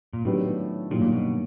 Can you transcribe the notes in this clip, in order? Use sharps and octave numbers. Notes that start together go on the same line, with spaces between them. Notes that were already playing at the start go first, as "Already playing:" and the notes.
A#2
A2 D#3 F#3 B3 D4 G4
G2 A#2 D#3 F#3 A#3
A#2
B2